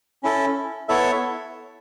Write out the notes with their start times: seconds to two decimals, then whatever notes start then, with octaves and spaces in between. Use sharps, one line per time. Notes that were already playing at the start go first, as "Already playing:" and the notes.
0.23 C#4 E4 A4
0.89 B3 E4 A4 C#5 E5